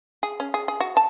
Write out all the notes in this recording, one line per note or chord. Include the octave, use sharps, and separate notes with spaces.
G#4
C#4
G#4
G#4
F#4
A5